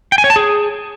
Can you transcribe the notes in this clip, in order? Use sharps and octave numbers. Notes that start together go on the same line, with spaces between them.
G5
G#5
C#5
A5
G#4